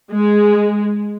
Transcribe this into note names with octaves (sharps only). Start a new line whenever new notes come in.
G#3